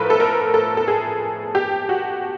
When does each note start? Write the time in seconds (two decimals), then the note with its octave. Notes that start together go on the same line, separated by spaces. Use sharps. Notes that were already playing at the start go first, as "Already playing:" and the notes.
Already playing: A2 F3 A3 A#4 B4
0.10 A4
0.20 A#4
0.54 A4
0.77 A4
0.88 G#4
1.55 G4
1.89 F#4